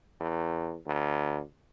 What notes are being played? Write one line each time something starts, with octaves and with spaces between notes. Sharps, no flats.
E2
D2